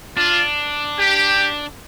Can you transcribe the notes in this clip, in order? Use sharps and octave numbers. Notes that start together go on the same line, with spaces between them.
D4 F4
G4